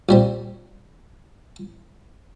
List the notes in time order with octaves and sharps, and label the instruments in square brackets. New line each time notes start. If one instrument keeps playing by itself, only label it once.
[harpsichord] A#1 G3 C4